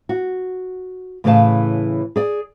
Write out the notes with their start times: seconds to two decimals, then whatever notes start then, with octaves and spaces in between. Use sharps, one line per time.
0.09 F#4
1.24 A2 C#3 E3 C5 F5 A5
2.16 G#4 D5